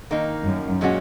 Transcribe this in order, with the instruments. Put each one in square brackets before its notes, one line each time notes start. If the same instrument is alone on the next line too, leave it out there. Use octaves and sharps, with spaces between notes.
[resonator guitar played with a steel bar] D#3 A#3 D#4
[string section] F#2
[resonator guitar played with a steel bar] A#2 G#3 C#4 F#4